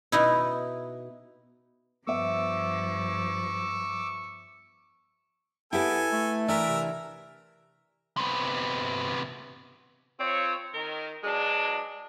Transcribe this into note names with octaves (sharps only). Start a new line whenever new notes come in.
B2 D#4 E4
G2 F3 B3 E5 C#6 D6 E6
B3 E4 G4 A4 B4 G#5
A3
E3 D4 A#4 E5
C3
C3 B3
F2 C4 F4 C#5
D#3 A#4
B2 F#3 G#3 D4